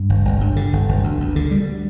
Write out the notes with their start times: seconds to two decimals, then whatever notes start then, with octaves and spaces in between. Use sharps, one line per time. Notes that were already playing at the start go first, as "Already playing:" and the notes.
Already playing: G2
0.10 G1
0.25 G1
0.41 G2
0.56 D3
0.73 G1
0.89 G1
1.04 D2
1.20 D2
1.36 D3
1.51 G3